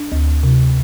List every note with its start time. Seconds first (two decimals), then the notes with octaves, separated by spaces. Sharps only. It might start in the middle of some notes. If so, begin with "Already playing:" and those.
Already playing: D4
0.12 D2
0.43 C3